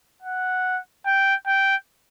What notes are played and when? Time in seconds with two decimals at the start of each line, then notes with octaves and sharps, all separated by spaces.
0.22 F#5
1.06 G5
1.47 G5